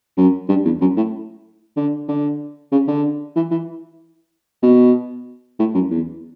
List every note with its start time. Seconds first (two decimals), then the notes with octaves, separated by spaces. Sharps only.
0.17 F#2
0.49 G2
0.65 E2
0.81 F#2
0.97 A2
1.77 D3
2.09 D3
2.72 C#3
2.88 D3
3.36 E3
3.51 E3
4.63 B2
5.59 A2
5.74 F#2
5.91 E2